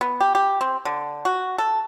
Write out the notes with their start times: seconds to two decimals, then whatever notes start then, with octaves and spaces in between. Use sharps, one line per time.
0.01 B3
0.20 G4
0.35 G4
0.61 C4
0.85 D3
1.25 F#4
1.58 A4